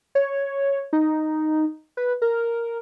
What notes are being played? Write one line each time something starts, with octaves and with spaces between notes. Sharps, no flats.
C#5
D#4
B4
A#4